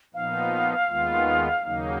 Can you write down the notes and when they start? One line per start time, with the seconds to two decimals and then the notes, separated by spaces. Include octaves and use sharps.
0.14 A#2 F3 B3 D#4 F5
0.89 D#2 D#3 G#3 B3 F4
1.64 D#2 C#3 F#3 A#3 D#4